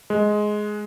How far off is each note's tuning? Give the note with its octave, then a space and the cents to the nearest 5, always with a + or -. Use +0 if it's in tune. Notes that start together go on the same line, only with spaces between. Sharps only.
G#3 +10